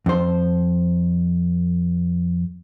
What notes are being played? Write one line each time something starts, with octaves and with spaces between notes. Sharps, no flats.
F2 C5